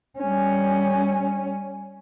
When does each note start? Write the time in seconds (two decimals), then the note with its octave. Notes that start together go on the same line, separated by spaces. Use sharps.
0.19 G3 C#4